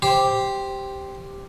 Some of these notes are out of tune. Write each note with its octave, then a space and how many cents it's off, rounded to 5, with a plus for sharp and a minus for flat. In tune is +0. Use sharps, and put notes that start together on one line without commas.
G4 +0 C5 +0